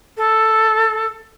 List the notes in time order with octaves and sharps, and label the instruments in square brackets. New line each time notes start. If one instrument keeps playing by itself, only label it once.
[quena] A4